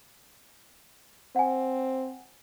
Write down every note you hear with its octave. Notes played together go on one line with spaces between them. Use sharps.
C4 F#5 G#5